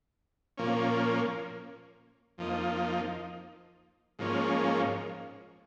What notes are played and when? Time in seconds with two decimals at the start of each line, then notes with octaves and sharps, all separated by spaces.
0.57 A#2 F3 A#3 C#4
2.38 F2 F3 A#3 D#4
4.19 G#2 F3 A#3 C#4